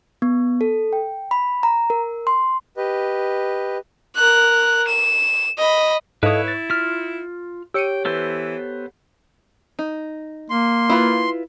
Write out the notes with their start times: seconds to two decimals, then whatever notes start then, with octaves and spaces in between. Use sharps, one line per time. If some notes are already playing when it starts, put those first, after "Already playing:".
0.22 B3
0.61 A4
0.93 G5
1.31 B5
1.63 A#5
1.90 A#4
2.27 C6
2.77 G4 B4 D#5
4.16 A#4 F#6
4.87 E7
5.58 D#5 B5
6.23 G#2 E4 A4 B4 C#5 D#5 F5 D#6
6.48 A6
6.70 F4 F6 B6
7.74 G4 C#5 G5 E6 C#7 D#7
8.05 E3 B3 A4 C5
9.79 D#4
10.50 A#3 C6
10.89 E4 F4 B4